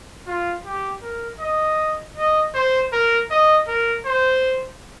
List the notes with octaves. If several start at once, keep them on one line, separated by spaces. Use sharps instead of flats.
F4
G4
A#4
D#5
D#5
C5
A#4
D#5
A#4
C5